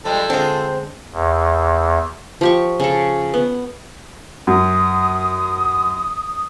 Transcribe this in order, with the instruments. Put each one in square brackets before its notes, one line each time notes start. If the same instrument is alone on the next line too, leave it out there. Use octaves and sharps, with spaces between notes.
[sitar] F3 G3 G#3 [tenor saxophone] A4
[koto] D3 G#3 [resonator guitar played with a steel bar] C4 [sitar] F4 C5
[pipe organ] E2
[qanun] F3 G4 C#6
C#3 A4
B3
[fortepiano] F#2 [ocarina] D#6